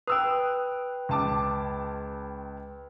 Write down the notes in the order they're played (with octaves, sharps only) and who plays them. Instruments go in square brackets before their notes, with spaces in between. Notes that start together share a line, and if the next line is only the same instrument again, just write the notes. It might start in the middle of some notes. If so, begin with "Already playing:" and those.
[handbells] B4 G5 [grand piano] D#6 E6 F#6
[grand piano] C#2 A5 D6